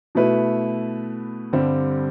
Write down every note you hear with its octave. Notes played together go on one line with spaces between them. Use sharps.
B2 A3 E4 B4
G2 D3 G3 C4